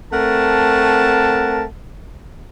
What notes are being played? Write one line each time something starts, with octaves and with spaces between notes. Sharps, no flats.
A3 C4 A#4 F#5 A5